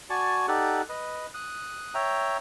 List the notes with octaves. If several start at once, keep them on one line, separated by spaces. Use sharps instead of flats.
F#4 D5 G#5 A5 C#6
D#4 G4 A4 D5 F#5
B4 D#5
D#6 F#6
C#5 E5 G5 A#5